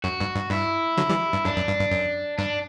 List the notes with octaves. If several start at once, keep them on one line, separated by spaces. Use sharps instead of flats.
F#2 F#4
G2
G2
G2 E4
D3 F#3
E3 G3
G2
F#2 D4
F#2
G2
G2
F#2
G2 D4